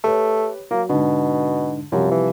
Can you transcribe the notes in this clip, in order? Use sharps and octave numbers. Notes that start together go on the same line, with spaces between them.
A3 G4 B4 C#5
F#3 A#3
G#2 B2 D3
F#2 C3 F3 G3
E3